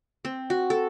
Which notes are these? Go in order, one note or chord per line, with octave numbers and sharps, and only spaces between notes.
C4
F#4
A4